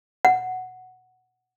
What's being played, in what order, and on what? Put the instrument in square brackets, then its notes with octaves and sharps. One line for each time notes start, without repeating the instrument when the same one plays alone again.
[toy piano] F#5